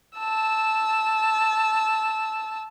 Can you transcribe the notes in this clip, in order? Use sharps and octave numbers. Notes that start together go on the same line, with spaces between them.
A5 E6